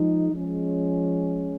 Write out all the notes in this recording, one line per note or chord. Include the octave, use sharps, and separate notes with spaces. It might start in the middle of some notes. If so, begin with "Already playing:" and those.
Already playing: F3 G#3 D#4
F3 G#3 C#4